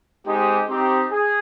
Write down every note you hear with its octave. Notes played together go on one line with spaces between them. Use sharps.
G#3 C4 D#4 G4
C4 D#4 G4
G#4